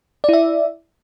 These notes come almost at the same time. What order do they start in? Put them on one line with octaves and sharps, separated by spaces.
D5 E4 E5